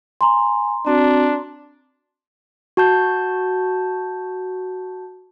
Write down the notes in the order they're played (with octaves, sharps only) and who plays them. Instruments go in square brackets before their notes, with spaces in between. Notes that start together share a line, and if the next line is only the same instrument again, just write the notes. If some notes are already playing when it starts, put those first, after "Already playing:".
[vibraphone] G#5 [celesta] A#5 C6
[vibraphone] C4 F#4 [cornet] D4
[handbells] F#4 A5 G6